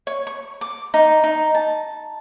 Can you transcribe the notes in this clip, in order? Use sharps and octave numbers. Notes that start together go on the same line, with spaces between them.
C#5
C#6
D6
D#4
D#4
A5